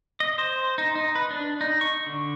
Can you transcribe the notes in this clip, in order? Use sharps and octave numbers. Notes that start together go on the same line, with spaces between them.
D#5
C5
D#4
D#4
B4
D4
D#4
C#6
D3